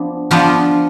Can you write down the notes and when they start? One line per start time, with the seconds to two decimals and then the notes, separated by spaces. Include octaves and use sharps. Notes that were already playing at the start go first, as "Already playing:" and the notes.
Already playing: F3 B3 D4
0.31 F3 B3 D4 F4